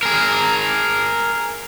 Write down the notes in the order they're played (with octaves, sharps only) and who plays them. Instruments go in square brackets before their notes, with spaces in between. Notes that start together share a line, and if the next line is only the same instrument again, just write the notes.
[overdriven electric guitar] G#4 A#4